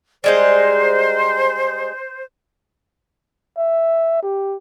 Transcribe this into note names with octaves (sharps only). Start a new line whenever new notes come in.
G3 G#3 D#4 C5
E5
G4